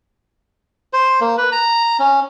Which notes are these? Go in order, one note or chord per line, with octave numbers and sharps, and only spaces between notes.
C5
A#3
B4
A#5
C#4